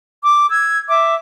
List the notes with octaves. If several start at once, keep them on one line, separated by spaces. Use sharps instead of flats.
D6
E6 G#6
E5 D6